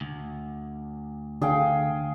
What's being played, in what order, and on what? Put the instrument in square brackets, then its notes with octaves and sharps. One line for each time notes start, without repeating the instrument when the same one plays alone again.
[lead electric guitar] D2
[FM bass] D3 [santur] G#4 F5 G5